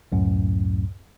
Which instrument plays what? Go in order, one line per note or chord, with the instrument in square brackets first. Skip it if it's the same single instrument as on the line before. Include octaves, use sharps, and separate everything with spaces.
[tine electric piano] C#2 F#2 A2